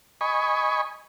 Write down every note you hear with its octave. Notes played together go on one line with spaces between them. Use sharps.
D#5 G#5 B5 C#6